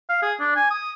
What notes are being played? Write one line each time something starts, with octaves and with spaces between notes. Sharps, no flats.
F5
G#4
D4
G#5
D#6